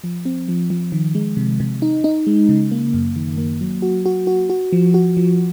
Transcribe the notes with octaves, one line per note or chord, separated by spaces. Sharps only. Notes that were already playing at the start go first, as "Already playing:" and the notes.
F3
C4
F3
F3
D#3
G#3
C3
C3
D#4
D#4
G#3
C#3
A#3
F#2
D#3
A#3
F#3
F#4
F#4
F#4
F#4
F3
F#4
F3